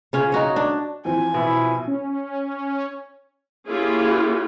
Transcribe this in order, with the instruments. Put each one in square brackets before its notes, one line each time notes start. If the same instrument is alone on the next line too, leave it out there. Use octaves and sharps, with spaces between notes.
[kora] C#3 C#4 F4
D#4 F#4 C#5
D4
[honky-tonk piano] E3 F3 C4 [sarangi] G#5
[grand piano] B2 [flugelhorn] E4
[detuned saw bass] C#4
[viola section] A#3 C#4 E4 F4 G4 G#4